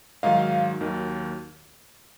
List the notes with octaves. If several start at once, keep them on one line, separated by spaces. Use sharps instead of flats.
G#2 D#3 F#3 D#5 F5
D#2 D#3 F#3